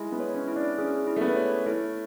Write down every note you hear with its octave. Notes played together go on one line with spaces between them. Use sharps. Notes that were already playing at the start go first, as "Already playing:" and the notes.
Already playing: G#3 E4
B3
C#5
C#4
E4
D4
C#4 G#4
E4
A3
B3
C#5
A3 E4